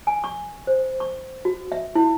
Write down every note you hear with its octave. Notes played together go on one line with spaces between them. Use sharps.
G#5
C#6
C5
C#6
F#4
E5
E4